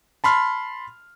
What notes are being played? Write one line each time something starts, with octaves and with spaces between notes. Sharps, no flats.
A5 B5 C6 F6